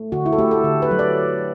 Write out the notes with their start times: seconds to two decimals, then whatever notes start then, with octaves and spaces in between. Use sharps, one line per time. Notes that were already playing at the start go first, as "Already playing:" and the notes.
Already playing: A3
0.12 D3 F#4
0.26 E4
0.33 A4
0.38 A3 G4
0.51 A4
0.64 D3
0.82 B4
0.91 F#3
0.99 D5